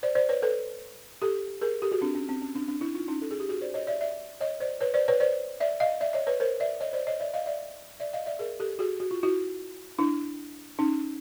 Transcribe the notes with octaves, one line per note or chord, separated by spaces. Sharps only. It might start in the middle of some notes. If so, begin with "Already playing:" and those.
C5 D5
C5 D5
B4 C#5
A4 B4
G4 A4
G#4 A#4
G4 A4
F#4 G#4
C4 D4
C#4
C4
C#4
C4 D4
C4 D4
D4 E4
D#4 F4
C#4 D#4
A4
G#4
G4
F#4 G#4
C5 D5
C#5 D#5
D5 E5
D5 E5
C#5 D#5
C5 D5
B4 C#5
C5 D5
B4 C#5
C5 D5
D5 E5
D#5 F5
D5 E5
C#5 D#5
B4 C#5
A#4 C5
D5 E5
C#5 D#5
C5 D5
C#5 D#5
D5 E5
D#5 F5
D5 E5
D5 E5
D#5 F5
D5 E5
G#4 A#4
G4 A4
F#4 G#4
F#4
F4
E4 F#4
D4 E4
C#4 D#4